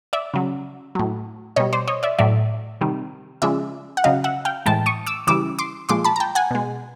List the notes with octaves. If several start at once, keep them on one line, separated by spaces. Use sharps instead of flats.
D5 E5
C#3 F#3
A2 F#3
B2 G3 C#5 D#5
C5 D5
C#5 D#5
D5 E5
A2 F#3 D5 E5
C3 D#3 G3
C#3 F3 G#3 D5 E5
F#5
C#3 F#3 D#5 F5
E5 F#5
F5 G5
A2 E3 G#3 G5 A5
C#6 D#6
D6 E6
C#3 E3 G3 D6 E6
C6 D6
A#2 F3 G#3 C6 D6
A5 B5
A#5
G5 A5
F#5 G#5
B2 G#3